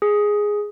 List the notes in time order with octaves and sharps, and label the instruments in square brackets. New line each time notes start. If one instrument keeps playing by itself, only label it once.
[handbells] G#4